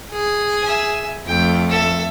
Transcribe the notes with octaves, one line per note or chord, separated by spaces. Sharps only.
G#4
E5 G#5
F2 A3 G5
A4 E5